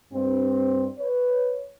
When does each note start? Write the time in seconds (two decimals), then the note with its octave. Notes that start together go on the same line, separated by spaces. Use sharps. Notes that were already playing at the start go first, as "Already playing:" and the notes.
0.13 G2 C4
0.99 B4 C#5